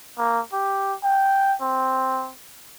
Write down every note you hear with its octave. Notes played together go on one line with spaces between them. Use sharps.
A#3
G4
G5
C4